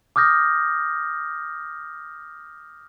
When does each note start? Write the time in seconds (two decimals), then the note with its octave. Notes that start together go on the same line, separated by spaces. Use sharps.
0.16 D6 D#6 F6 G6 A#6